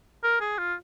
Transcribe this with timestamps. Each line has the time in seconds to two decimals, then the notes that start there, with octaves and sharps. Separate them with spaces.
0.23 A#4
0.41 G#4
0.59 F4